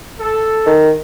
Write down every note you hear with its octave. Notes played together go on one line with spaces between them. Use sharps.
A4
D#3